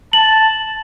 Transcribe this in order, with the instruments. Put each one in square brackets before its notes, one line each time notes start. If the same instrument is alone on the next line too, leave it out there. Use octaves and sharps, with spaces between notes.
[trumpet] A5 [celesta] F#7